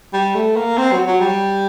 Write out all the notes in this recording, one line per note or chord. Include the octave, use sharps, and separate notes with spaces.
G3
A3
A#3
C4
F#3
F#3
G3